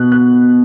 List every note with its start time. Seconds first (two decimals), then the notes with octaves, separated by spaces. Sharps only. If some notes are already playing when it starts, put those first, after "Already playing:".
Already playing: B2 F#6
0.12 F#6